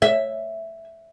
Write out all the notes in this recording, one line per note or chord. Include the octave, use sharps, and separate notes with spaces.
E5